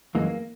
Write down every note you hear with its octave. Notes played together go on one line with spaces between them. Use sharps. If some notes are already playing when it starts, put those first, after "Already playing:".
F#2 E3 G#3 A#3